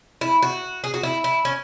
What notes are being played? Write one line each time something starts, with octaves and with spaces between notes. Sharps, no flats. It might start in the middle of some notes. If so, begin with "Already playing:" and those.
E4
F#4
G#4
F#4
E4
E4
C#4